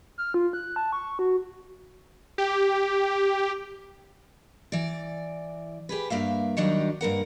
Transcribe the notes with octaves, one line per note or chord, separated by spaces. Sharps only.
F6
F4
F#6
A5
C#6
F#4
G4
E3 D5
G4 G#4 B4
G2 A#3 E5 F5
D#3 F#3 G3 D4 D#4
G2 A#3 A#4 F#5